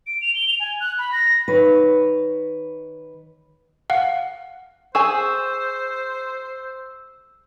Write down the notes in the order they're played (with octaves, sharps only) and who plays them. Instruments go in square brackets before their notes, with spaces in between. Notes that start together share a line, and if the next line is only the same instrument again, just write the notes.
[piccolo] D7
F7
G7
F7
G#5
F#6
B5
A#6
[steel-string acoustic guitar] D#3 B4 C#5
[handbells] F5 F#5
[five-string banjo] G#4 G#5 [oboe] C5 [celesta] C#6 [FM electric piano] E6